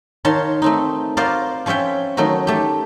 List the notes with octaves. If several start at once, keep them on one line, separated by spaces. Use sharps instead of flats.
D#3 C#5 F5 A5 C6
A3 C4 D#4
F4 F#4 A#4 C5 D5 F5
F3 C#4 C#5 E5 G5
D#3 F#3 A3 D#4 F#4
A3 G4